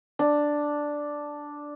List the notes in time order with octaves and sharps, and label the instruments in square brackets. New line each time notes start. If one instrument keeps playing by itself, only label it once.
[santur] D4